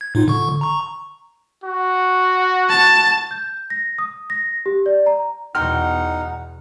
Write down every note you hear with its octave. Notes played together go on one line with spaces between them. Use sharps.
G#6
A2 D#4 F4
D3 C#6
A#5 C#6
F#4
A5
G6
A#6
D#6
A#6
G4
D5
A#5
E2 B2 D#4 F#4 F#5 G5 C6 F6